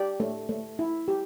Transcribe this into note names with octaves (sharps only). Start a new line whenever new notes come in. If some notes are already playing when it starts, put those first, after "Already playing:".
Already playing: G4 D5
A3
A3
E4
G4